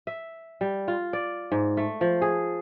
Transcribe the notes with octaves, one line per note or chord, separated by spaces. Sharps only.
E5
G3
F4
D5
G#2
A3
F3
G#4